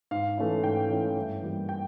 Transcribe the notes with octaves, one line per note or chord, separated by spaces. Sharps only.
G#2 F5
E3 A3 C#4 E4
G#2 G5
E3 A3 C#4 E4
G2
E3 G3 A#3
G5